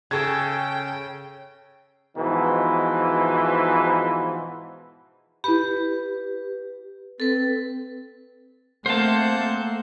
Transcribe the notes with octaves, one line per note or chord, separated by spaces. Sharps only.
C#3 A4 G5 C#6 G#6
G#2 B2 E3 F3
E4 G4 B4 B5
C4 A4 B4
A3 A#3 C4 C5 F#5 A5 G6